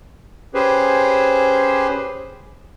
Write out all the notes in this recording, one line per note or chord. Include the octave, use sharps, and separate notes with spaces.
C#4 G4 G#4 B4 C5